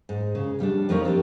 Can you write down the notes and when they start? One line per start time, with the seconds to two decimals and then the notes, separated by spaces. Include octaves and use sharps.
0.09 G#2
0.35 C#3
0.59 F3 G3 B3 D4
0.89 F2 F3 A#3 D#4 A#4 C#5
1.04 C4 D4 E4 G4